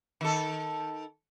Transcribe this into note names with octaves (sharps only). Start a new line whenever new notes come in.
D#3 A4